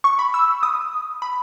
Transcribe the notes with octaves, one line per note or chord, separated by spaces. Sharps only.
C#6
B5
E6
D#6
B5